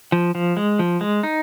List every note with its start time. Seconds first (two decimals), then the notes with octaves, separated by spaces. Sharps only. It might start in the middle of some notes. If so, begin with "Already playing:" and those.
0.12 F3
0.35 F3
0.57 G#3
0.79 F3
1.01 G#3
1.23 D#4